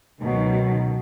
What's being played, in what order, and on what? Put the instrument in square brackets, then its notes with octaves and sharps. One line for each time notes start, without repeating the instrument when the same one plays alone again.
[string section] C#2 B2 D#3 F#3